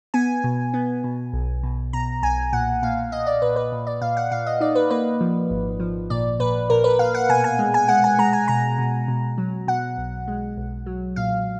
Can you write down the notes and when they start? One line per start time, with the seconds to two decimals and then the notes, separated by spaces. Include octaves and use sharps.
0.14 B3 G#5
0.44 B2
0.74 B3
1.04 B2
1.33 B1
1.63 B2
1.93 B2 A#5
2.23 B1 G#5
2.52 A#2 F#5
2.82 A#2 F5
3.12 A#2 D#5
3.27 D5
3.42 A#2 B4
3.56 B4
3.72 A#2
3.87 D5
4.02 A#2 F5
4.17 F#5
4.31 A#2 F5
4.46 D#5
4.60 D#4 D5
4.75 B4
4.91 A#3 B4
5.21 F3
5.50 G#1
5.80 F3
6.10 A#2 D5
6.40 A#2 B4
6.70 A#2 A#4
6.84 B4
6.99 A#2 F5
7.14 F#5
7.29 B2 G#5
7.44 G#5
7.59 G#3
7.74 G#5
7.88 G#3 F#5
8.04 G#5
8.19 G#3 A#5
8.33 G#5
8.48 B2 A#5
8.78 B2
9.08 B2
9.38 F#3
9.67 B2 F#5
9.98 B1
10.28 G#3
10.57 B1
10.86 F#3
11.16 A#2 F5